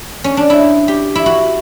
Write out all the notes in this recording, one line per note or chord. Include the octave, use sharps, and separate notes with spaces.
C#4
D4
E4
G4
E4
F#4